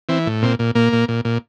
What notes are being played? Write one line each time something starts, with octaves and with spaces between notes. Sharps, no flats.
E3 C4
A2
A#2 C4
A#2
A#2 A#3
A#2
A#2
A#2